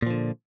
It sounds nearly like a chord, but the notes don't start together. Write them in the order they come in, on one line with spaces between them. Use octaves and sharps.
A#2 F3 D3